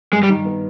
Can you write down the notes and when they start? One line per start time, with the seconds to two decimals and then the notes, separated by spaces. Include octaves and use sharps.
0.12 G2 G#3
0.23 G3
0.29 D#3
0.45 B3